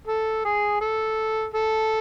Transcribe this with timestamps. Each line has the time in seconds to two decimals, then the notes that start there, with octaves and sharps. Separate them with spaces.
0.07 A4
0.45 G#4
0.81 A4
1.54 A4